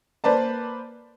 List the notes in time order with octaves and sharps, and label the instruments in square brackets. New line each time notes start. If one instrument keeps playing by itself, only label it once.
[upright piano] A#3 B4 C5 D5 A5